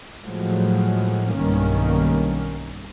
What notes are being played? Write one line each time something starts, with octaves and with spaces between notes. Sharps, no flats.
A2 F3 F#3 G#3
B1 G2 D#3 A#3 C#4